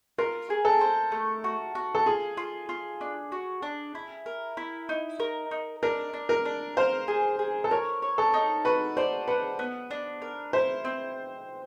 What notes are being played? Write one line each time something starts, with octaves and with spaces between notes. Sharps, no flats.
F4 A#4
G#4
A4
C5
A3
F#4
F#4
A4
F4 G#4
F4
F4
D4
F#4
D4
E4
A#4
E4
D#4
A#4
D#4
D4 A#4
D4
A#4
D4
C5 F5
G#4
G#4
A4
A#4 C#5
C#5
A4
D#4
F#4 B4
C5 D5
B4 F#5
B3
D4
A#4
E4 C5
C4